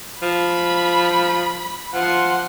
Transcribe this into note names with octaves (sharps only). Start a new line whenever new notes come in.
F3 B5
F3 F#5 C6